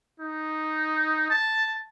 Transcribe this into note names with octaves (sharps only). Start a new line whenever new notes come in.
D#4
A5